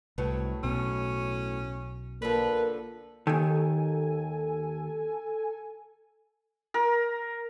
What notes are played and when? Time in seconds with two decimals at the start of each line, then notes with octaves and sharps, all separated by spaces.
0.18 C2 A2 F#3 B3
0.63 B1 B2 C#4
2.22 D3 F3 A#3 B4
3.27 D#2 D#3 A4 G#5
6.74 A#4